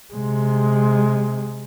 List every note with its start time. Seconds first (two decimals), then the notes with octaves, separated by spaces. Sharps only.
0.13 C3 G#3